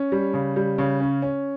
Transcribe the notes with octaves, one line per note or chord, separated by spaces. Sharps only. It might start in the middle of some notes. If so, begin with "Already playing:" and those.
Already playing: C#4
G3
C#3
G3
C#3
C#4
C#4